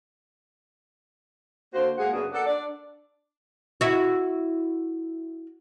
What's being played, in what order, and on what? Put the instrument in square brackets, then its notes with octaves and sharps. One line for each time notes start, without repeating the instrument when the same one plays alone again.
[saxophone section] D3 A#3 F#4 C5
G#3 A#3 G#4 F#5
F#2 C#3 B3 D4 F#4 G#4
A#3 A4 D5 F#5
D4 D5
[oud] E4 F#4